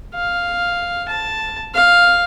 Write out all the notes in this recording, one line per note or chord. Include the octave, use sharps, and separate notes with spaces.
F5
A5
F5